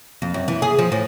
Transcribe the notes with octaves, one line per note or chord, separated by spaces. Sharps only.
F2
F#2
E3
G#4
F3
A2